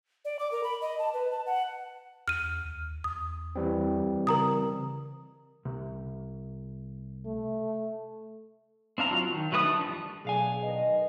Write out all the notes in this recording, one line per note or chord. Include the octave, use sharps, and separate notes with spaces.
D5
D6
A#4
B5
D#5
A5
B4
A5
F#5
E2 F6 D#7
D#2
E2 D#6
E3 G3 C4
C#3 A#4 A#5 D#6
C2
A3
C4 D4 F5 A#5
F#3 F4
D#3
F#3 A3 B4 E5 D#6
D4
F3 G3
B1 A3 D4 G#4 F5 G#5
D#3 B4 D#5